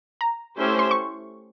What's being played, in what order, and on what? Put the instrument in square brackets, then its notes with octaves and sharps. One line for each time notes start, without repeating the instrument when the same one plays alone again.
[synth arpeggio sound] A#5
[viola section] A3 C#4 E4 G4 C5
[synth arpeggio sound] C6
C#6